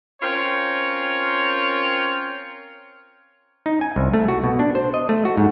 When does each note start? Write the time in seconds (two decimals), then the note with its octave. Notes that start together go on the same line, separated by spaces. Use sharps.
0.22 C4 C#4 F4 A#4 C#5
3.66 D#4
3.81 G#5
3.96 C2
4.13 A3
4.28 F#4
4.44 B2
4.59 D4
4.75 C5
4.94 D#5
5.09 A3
5.25 F#4
5.37 G#2